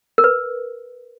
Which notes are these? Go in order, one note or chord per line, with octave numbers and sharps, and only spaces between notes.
A#4
B4